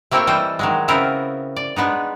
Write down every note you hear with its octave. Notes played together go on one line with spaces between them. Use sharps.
A3 A#3 C4 E4 C#5 G5
E3 G3 A4 C5 D#5 G5
D#3 F#3 G#3
C#3 B3 C4 E4 A#4
D5
G#3 B3 D4 D#4